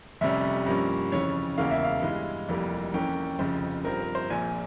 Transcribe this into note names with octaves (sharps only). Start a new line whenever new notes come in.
F1 F2 C3 G3 C#4 E5
G2 F3 A#3 C#4
F2 C#3 E3 C#5
E1 E2 C#3 E3 A#3 F5
E5
F5
G2 E3 G#3
F1 F2 E3 G3 A#3
F2 E3 A#3 C#4 G5
F1 F2 C#3 F3 C5
G2 F3 C4 A#4
A#4
C5
A#1 A#2 F3 G#5